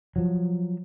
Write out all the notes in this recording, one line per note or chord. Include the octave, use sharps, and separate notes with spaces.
F3 F#3